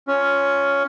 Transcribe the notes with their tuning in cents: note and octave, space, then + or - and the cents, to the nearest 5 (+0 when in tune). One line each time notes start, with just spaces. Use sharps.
C#4 +10 F4 +0